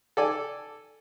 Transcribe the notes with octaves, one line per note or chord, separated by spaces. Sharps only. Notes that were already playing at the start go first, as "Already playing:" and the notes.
A4 D5 G#5